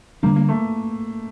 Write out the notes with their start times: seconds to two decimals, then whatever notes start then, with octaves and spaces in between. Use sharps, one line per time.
0.23 D3 G3 A#3 D4
0.36 A#3
0.49 A3